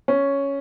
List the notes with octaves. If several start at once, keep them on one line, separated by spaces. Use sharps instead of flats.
C#4